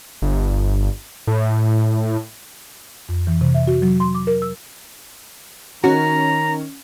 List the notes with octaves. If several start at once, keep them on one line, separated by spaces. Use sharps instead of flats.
G1
A2
F2
E3
C3
E5
F#4
F#3
C6
D6
A#4
E6
D#3 C#4 F#4 A#5